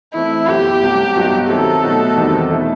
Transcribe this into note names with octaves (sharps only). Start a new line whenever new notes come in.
E3 A3 C4 E4
F#2 F#3 B3 E4 G4 A4
C2 C3 F#3 A3
G2 F#3 B3 D#4 F#4
D#3 F#3 C4 E4 A4
B2 A3 D#4 F#4
E2 D#3 G3 C4 D#4
B2 A3 E4 A4